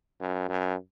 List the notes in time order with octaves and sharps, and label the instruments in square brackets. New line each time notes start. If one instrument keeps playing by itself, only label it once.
[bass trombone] F#2
F#2